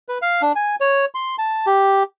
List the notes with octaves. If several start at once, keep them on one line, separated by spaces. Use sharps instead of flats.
B4
F5
D4
G#5
C#5
C6
A5
G4